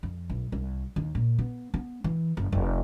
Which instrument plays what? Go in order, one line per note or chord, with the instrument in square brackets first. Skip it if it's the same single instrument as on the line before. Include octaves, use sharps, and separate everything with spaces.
[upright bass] F2
B1
C2
D#2
A#2
B3
B3
E3
F#1
F1